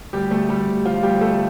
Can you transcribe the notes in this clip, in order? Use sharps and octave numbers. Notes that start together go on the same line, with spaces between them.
D2 G3 G4
D2 A3 A4
D2 G3 G4
D2
F3 F4
D2 G3 G4
D2 A3 A4